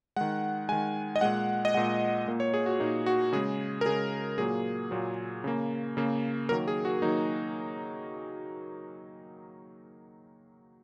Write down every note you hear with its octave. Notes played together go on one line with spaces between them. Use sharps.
D#3 G#3 F#5
D#3 G#3 G#5
D#5
A#2 G#3 F#5
D#5
A#2 G#3 F#5
A#2 A#3
C#5
G#4
F#4
A#2 A#3 D#4
F#4
C#3 G#3 G#4
A#4
C#3 G#3 G#4
A#2 F#3 A#3 G#4
A#2 F#3 A#3
C#3 A#3
C#3 A#3
D#3 F#3 A#3 A#4
G#4
F#4
D#3 F#3 A#3 D#4